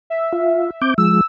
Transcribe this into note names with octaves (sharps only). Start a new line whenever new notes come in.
E5
F4
C4 D6 G6
F3 G#3 E6